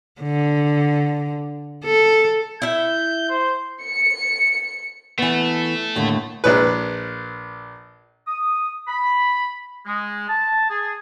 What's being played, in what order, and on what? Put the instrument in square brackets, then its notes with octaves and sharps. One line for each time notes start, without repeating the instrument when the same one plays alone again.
[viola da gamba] D3
A4
[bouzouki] E4 E5 [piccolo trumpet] G6
[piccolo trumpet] C5
[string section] C#7
[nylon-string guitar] E3 B3 [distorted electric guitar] A3
[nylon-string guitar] D#2 A2 D3
[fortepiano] A#1 A#2 B4
[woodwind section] D#6
B5
G#3
A5
G#4